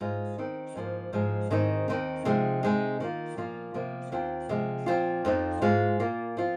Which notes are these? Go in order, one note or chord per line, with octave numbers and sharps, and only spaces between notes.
G#2 G#3 F4
D#3 C4 D#4
G#2 F3 A#3
G#2 F3 G#3
G#2 D#3 C4 D#4
D#2 D#3 C4 D#4
C3 F3 G#3 D#4
C3 D#3 G#3 C4 D#4
D#3 A#3 F4
A#2 F3 A#3 F4
C3 F3 A#3
D#2 D#3 C4 F4
C3 F3 G#3
A#2 F3 C4 F4
F2 F3 C4 D#4
G#2 G#3 F4
A#2 A#3 F4
F3 C4 F4